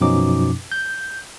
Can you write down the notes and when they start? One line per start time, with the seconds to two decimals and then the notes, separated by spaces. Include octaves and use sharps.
0.01 F#2 B2 F3 C#4 D#4 D6
0.72 G6